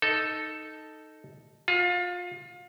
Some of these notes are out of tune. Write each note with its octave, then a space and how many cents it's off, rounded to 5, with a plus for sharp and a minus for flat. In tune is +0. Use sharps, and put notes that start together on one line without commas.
D#4 +0 A4 +0
F4 +30 F5 -35